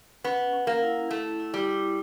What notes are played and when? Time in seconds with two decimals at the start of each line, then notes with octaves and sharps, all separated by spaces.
0.24 B3 C#4
0.53 C#4
0.67 A#3
0.83 E4
1.10 A3 E4
1.40 E4
1.54 G3
1.69 E4